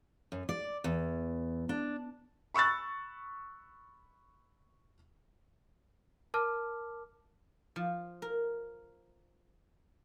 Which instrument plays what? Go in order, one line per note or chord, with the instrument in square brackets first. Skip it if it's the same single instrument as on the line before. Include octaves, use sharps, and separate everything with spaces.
[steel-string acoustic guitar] F#2
D5
E2
D4
[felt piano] B5 C#6 E6 F#6 A6
[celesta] A#4 A5 D6 F6
[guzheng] F3
A#4